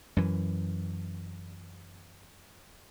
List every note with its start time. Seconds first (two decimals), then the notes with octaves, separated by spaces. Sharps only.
0.17 F#2 E3